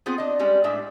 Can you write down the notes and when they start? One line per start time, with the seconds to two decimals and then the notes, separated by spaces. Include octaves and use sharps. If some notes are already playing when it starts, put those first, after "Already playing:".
0.06 B3 C4 F4 G#4 C5
0.18 D4 D#5
0.39 G3 G#3 C#4 G4
0.64 A2 G#3 D4 E5